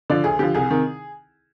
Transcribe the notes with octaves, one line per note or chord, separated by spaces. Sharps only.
D3 F3 D5
D2 G#4
D3 F3 G4
C2 G#4
C3 D#3